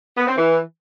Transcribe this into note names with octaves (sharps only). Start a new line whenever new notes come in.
B3
C4
E3